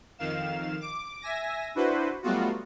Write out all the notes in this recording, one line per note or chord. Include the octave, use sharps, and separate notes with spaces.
F2 D#3 F5 E7
D6
E5 G#5 A#6
D4 E4 F#4 B4 C5
F#3 G3 A3 B3 F4 F#4